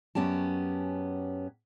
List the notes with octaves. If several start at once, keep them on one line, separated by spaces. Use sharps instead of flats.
F#2 B3 C#4 G4 A5